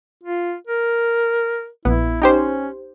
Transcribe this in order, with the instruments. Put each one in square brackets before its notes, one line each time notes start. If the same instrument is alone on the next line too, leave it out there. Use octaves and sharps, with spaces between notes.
[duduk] F4
A#4
[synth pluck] A#1 B3 [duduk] E4
[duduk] C#4 [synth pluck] D#4 G4 C5